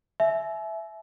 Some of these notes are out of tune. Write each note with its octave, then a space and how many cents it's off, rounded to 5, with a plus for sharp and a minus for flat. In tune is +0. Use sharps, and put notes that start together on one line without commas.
E5 +0 G#5 +45